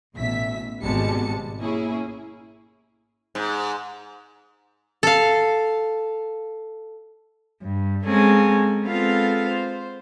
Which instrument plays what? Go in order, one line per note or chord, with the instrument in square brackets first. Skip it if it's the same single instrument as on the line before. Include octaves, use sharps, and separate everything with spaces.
[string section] A1 B2 E5 B6
G#1 B2 G3 G#3 A5 C#7
A#3 C#4 E4 G#4
[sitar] G#2
[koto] A4 F5
[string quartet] G2
G#3 A#3 C4 C#4 G#4 A4
G#3 B3 C4 F4 A4 F5
C5